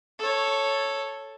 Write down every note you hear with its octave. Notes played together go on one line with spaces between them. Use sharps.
A4 C#5